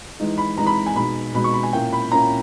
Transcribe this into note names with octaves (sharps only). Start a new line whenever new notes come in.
E3 G#3 D#4
B5
E3 G#3 D#4 A#5
B5
G#5
B2 G#3 D#4 B5
B2 G#3 D#4 B5
C#6
B5
G#5
A#2 A#3 C#4 E4 G5
B5
A#2 A#3 C#4 E4 A#5